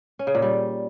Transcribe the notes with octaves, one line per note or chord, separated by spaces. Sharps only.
C#4
C#3
A#2
G3